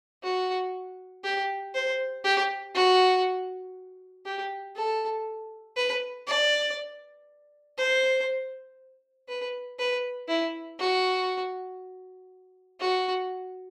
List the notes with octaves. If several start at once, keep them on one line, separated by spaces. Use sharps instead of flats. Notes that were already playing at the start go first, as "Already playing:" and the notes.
F#4
G4
C5
G4
F#4
G4
A4
B4
D5
C5
B4
B4
E4
F#4
F#4